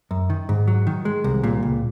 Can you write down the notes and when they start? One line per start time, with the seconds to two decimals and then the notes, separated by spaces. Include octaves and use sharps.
0.11 F#2
0.30 D#3
0.49 G#2
0.68 F#3
0.87 D#3
1.05 G#3
1.24 C2
1.44 A#2
1.63 C#2